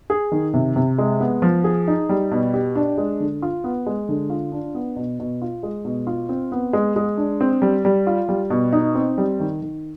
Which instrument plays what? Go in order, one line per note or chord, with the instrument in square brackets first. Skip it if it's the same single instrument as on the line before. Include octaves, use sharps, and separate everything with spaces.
[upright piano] G#4
D#3
C3
C3
G#3
B3
F3
G#4
D#4
G3
B2
G4
D4
G#3
D3
F4
B3
G#3
D3
F4
D4
B3
B2
B2
F4
G#3
B2
F4
C4
B3
G#3
G#3
D4
C4
G3
G3
F4
G3
B2
D#4
C4
G3
D#3
D#3